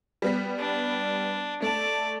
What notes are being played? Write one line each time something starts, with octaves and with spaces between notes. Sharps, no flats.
G3 B3 B6
D4
A3 D5 A5